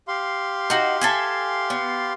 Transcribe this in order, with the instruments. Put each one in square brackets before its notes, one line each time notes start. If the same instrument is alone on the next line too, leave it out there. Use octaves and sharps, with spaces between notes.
[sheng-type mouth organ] G4 F5 C6
[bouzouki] D#4 F#4
A4 E5 G#5
B3